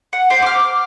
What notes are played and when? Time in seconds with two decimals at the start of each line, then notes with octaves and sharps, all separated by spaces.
0.13 F#5
0.30 G4 C5
0.42 D6 F6